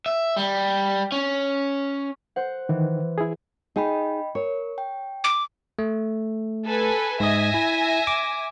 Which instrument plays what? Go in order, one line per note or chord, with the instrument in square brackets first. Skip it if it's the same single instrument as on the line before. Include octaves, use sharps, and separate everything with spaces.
[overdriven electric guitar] E5
G3
C#4
[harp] C5 F#5
[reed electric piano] D#3 [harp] E3
[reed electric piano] E4 G#4
[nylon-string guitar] D#4 G#4 [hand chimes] D#5 G5 B5
[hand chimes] A#4 [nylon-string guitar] C#5
[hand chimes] G5
[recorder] D6
[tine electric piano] A3
[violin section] A4 B4 G#5
[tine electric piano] G#2 D#5 [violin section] E5 G#5 A#6
[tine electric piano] E4
D6